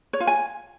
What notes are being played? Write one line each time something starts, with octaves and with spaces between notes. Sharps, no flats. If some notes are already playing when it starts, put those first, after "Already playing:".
C#5
F4
G#5